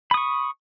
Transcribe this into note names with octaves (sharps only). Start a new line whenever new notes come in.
B5 C#6 D#6